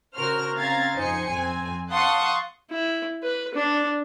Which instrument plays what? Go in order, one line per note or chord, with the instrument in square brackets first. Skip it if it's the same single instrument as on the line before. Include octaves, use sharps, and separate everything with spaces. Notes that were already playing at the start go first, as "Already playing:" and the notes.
[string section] C#3 F#4 A#4 C5 F6
C#3 C4 F5 A#5 G#6 A6
F2 D#4 C5 G#5 C#7
F2 C4 G#5
F5 F#5 A5 C6 C#6 D#6
[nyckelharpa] E4
B4
D4